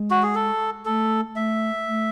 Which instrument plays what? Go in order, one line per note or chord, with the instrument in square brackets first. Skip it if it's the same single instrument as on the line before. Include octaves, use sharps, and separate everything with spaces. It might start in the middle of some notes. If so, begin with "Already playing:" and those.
Already playing: [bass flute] G#3
[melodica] F#4
G#4
A4
[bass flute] A3 [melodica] A4
[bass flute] A3 [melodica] E5
[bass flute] A3